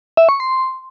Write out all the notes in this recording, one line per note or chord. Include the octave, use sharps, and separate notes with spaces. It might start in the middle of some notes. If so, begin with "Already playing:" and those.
E5
C#6
C6